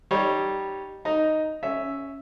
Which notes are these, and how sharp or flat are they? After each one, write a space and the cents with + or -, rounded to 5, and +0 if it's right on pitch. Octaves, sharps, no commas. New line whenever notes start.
G3 -10 D#4 -20 C#5 +0
D#4 +0 A#5 +0
C#4 +0 E5 +0